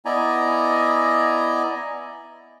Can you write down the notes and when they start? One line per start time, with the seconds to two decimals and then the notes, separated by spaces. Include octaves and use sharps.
0.05 B3 E4 D5 D#5 G#5 A#5